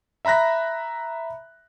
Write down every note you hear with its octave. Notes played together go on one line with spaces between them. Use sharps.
E5 A#5 B5 F#6 A#6